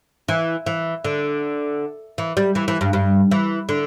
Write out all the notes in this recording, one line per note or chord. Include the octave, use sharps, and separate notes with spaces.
E3
E3
D3
E3
G3
E3
E3
G2
G2
E3
D3